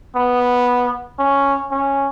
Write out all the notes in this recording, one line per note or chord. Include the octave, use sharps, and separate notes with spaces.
B3
C#4
C#4